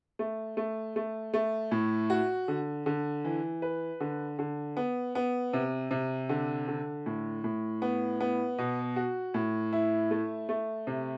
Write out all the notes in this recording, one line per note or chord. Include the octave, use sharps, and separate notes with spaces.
A3
A3
A3
A3
A2
F#4
D3
D3
E3
B4
D3
D3
B3
B3
C3
C3
D3
D3
A2
A2
B3
B3
B2
F#4
A2
E4
A3
A3
C3